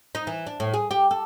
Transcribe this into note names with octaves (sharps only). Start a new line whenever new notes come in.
D#4
E3
D4
A2
G#4
G4
A4